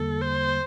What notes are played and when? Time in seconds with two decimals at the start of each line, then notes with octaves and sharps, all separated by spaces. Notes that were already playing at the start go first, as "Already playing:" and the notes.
Already playing: E2 D3 G3 A#3 A4
0.21 C5